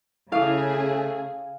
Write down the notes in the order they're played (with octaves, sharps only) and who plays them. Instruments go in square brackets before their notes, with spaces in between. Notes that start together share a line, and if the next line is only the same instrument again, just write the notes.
[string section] C#3 G#4 [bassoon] A3 [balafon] E4 [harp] F5 D#6